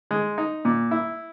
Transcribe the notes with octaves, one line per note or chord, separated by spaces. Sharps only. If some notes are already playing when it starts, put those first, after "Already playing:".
G#3
D#4
A#2
E4